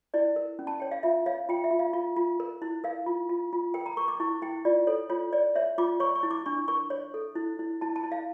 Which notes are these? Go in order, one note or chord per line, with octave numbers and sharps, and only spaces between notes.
E4 D5
A#4
C#4
A5
C#5 G5
F5
F4 E5
C#5 F5
F4 G5
E5
F4
F5
F4
F4
A#4
E4
A#4 F5
F4
F4
F4
A#4 G5
A#5
A#4 C#6
D6
E4 C#6
E4 G5
F4 D5
A4 C#5
F4 C#5
C#5 D5
C#5 E5
F4 D6
C#5 C#6
C#6
E4
D6
D4 C#6
C#6
A#4 C#6
C#5
A4
E4
E4
E4 A5
A5
E4
F5